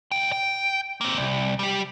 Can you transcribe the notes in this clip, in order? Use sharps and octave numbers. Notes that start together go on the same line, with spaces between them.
C#2 G5
G5
A#3 C4
C2
G3 G4